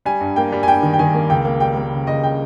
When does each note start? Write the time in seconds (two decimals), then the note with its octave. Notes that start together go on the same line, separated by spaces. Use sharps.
0.06 G3 G#5
0.21 G2
0.36 A#3 G5
0.52 G3
0.63 G#5
0.67 G2 G5
0.83 D#3
0.93 G5
0.99 D#3 G#5
1.14 A#3
1.30 C#2 G5
1.45 A#3
1.60 G3 G5
1.77 A#3
1.92 C#3
2.07 C#2 D#5
2.23 C#3 G5